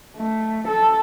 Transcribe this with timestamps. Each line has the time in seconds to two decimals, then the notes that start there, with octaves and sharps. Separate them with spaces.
0.17 A3
0.68 A4